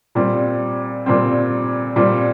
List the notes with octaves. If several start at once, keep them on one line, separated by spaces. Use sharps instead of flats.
A#2 G3 C4
A#2 G3 C4
A#2 G3 C4